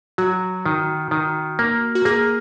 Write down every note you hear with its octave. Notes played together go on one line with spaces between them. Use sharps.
F#3 F#4
D#3
D#3
A#3
F#4
A#3 G#4